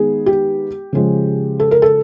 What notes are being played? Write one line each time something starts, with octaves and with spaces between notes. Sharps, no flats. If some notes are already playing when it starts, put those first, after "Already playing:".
Already playing: D#3 G#3 B3 G#4
G4
C#3 F3 G#3
A4
A#4
A4